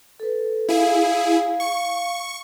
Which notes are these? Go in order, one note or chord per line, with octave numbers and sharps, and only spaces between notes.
A4 B4
E4 G#4 F5
C#6